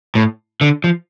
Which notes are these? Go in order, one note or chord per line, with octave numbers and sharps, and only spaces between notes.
A2
D3
F3